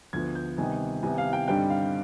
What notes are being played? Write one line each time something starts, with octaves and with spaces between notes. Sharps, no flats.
D2 D3 F3 B3 G#6
G6
C3 D#3 G3 B3 D#4 G#5
C2 C3 D#3 B3 G#5
F5
G5
G2 D3 G3 C4 D#4 G5
F5